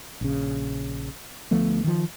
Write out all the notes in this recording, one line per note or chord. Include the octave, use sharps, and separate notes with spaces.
A#1 C#3
D2 F3 A3 B3
D#3 F3